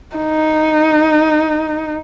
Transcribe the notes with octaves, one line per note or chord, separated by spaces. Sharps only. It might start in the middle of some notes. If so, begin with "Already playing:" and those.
D#4